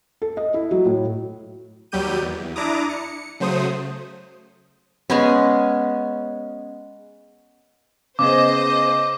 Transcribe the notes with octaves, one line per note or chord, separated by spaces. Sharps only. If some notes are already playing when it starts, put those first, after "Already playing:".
A4
D#5
E4
F#3
A2
D#2 F#3 G3 G4 G6 D#7
E2
D4 E4 A#5 D6 D#6
C#7
C#3 F#3 A3 C5 D#6
G#3 B3 C#4
C#3 B3 G#4 C5 D#5 D6